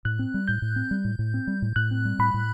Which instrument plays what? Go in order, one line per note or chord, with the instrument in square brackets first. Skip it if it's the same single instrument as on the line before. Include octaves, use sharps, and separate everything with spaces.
[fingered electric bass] A2 [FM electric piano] F#6
[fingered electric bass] C4
G3
[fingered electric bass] A2 [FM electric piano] G6
[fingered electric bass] A2
C4
G3
A2
A2
C4
G3
A2
[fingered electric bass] A2 [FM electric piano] F#6
[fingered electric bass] C4
G3
[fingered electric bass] A2 [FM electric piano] B5
[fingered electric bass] A2